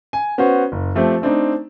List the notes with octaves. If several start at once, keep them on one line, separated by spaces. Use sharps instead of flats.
G#5
B3 C#4 F#4 C5
F#1
F3 A3 C4 G4
A3 C4 D4 D#4